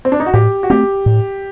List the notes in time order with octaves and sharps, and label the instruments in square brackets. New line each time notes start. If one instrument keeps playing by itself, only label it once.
[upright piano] C4
D4
D#4
F#4
[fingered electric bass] A2 [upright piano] G4
[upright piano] F#4
[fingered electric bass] A3 C4 [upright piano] G4
[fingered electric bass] A2